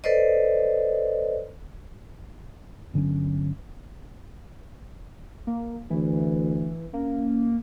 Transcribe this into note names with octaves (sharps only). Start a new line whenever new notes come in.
A4 B4 C5 D5 D#5
G1 D3 F#3 C#4
A#3
D2 E3
A#3 C#4